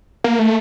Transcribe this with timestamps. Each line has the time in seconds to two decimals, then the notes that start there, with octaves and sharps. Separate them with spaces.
0.24 A#3
0.39 A3